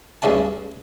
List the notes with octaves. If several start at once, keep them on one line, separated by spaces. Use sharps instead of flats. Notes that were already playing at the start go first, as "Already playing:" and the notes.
D2 G2 C#3 C#4 E4 A5